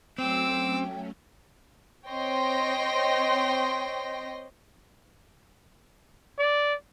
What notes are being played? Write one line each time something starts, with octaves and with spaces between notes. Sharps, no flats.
F#3 A3 C4 C#4 G5 D6 E6
C4 C#5 D#5 G5 C6 A#6
D5